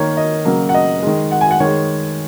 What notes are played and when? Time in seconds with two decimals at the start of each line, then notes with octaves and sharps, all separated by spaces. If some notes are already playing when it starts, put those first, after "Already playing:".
Already playing: D#3 A#3 C#5
0.17 D#5
0.45 C#3 F#3 A#3
0.69 F#5
0.74 D#5
1.03 D#3 G#3
1.31 F#5
1.41 G#5
1.51 F#5
1.60 D#3 G#3 C#5